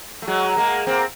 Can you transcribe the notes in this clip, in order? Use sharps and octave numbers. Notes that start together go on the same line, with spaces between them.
A3
F#3 G#3
G#3 A#3
A#3 C4